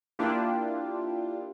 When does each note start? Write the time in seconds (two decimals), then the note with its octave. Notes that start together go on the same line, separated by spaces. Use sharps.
0.19 A#3 D4 E4 F4 G4